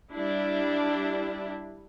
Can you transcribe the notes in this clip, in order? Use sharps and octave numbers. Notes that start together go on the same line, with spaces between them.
G3 D4 E4